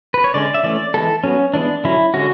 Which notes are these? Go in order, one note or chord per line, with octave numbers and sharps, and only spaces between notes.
B4
C#5
D3 G#3 C#4 D5
E5
E3 A3 C#4 D5
E3 G#3 B3 A4
F#3 B3 C#4
E3 G#3 B3 D4
D3 F#3 C#4 E4
D3 G#3 C#4 F#4